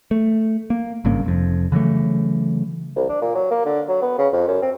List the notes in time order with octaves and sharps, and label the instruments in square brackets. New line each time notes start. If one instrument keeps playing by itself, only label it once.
[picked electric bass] A3
A#3
G#1 G2 C#3 A#3
F1 F2
C#3 E3 F#3 A3
[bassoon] C2
D4
A#2
F#3
A#3
D3
F#3
B3
C#3
F2
F#2
C4